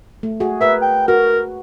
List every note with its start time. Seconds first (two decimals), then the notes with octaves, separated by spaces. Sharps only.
0.23 A3
0.40 F#4 G#4
0.61 A#4 B4 E5
0.81 G5
1.08 F#4 A#4